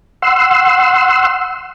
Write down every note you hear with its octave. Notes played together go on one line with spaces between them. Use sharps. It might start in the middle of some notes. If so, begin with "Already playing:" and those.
F#5 C6 E6